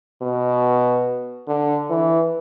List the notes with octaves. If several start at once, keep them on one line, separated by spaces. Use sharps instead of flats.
B2
D3
E3